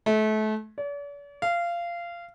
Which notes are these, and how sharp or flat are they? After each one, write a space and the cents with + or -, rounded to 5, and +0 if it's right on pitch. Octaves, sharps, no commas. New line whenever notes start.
A3 -30
D5 -45
F5 -20